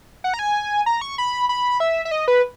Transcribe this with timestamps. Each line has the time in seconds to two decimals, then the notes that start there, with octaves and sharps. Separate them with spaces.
0.24 F#5
0.34 A#5
0.39 G#5
0.86 A#5
1.01 C#6
1.18 B5
1.49 B5
1.80 E5
2.05 E5
2.11 D#5
2.28 B4